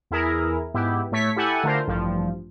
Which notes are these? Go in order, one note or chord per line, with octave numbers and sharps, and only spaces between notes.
E2 E4 G#4 A#4
G#2 B3 E4 G4
A2 A3 C#5 C#6 B6
E4 G4 A4 F#5 G#5
D3 A3 F4 A#4 C5
A1 G2 F3